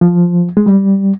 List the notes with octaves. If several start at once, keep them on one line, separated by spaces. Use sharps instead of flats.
F3
G#3
G3